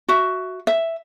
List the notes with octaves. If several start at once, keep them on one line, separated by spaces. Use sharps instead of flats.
F#4 E5
E5